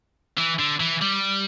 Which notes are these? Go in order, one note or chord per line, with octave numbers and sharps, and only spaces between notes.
E3
D3
E3
G3